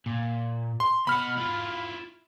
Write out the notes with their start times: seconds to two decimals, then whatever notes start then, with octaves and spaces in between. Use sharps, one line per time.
0.06 A#2
0.80 C6
1.07 B2 F#5 B5 F6
1.37 E4 F4